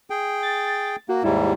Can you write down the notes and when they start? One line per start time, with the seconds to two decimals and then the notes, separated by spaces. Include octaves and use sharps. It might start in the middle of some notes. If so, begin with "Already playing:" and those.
0.10 G#4 G5
0.43 A6
1.09 A#3 F#4
1.24 D#2 G#2 G3 E4